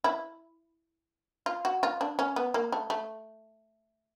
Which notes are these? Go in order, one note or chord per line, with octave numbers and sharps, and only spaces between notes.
E4
F4
F#4
F4
D4
C#4
B3
A#3
A3
A3